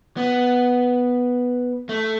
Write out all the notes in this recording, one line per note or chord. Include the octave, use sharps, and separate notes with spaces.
B3
A3